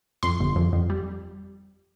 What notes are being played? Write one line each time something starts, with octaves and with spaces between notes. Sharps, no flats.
F2 C6
G1
F2
F2
G3